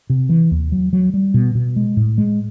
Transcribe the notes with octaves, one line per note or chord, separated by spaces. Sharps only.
C3
E3
D#2
F#3
F#3
G3
B2
B2
G#3
A2
G#3